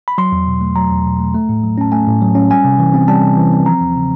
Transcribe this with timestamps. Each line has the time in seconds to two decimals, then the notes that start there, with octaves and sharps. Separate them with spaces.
0.08 B5
0.18 F#3 C6
0.32 E2
0.47 B2
0.61 A3
0.76 F#3 A#5
0.91 E2
1.05 B2
1.20 A3
1.35 A3
1.49 A2
1.63 F#3
1.78 C#4 A5
1.92 A3 G#5
2.07 A2
2.22 F#3
2.35 C#4
2.50 G3 G#5
2.64 C3
2.79 E3
2.94 C4
3.08 G3 A5
3.23 C3
3.37 E3
3.52 C4
3.66 F3 A#5
3.80 E2
3.96 C#3